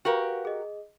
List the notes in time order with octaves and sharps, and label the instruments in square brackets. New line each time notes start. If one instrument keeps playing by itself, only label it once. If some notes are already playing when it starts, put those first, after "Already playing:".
[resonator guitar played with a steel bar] F#4 G4 A#4 [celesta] B4 F5
[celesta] G#4 D#5